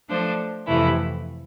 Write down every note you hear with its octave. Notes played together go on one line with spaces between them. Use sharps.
F3 A3 D4 A4 C5
F2 C3 E3 A3 E4